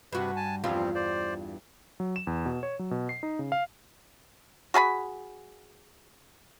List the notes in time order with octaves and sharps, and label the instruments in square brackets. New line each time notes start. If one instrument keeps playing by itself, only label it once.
[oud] G2 F#4 [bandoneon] C3 B4
[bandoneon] G#5 A5
[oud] E2 G2 F4 [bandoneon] F3 G3 C4
[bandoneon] C5 D5
[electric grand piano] F#3
E7
E2
B2
C#5
F#3
B2
C7
D#4
C#3
F5
[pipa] F#4 G#4 A5 B5